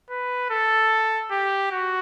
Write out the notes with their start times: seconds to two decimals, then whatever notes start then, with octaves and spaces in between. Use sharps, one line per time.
0.11 B4
0.50 A4
1.31 G4
1.71 F#4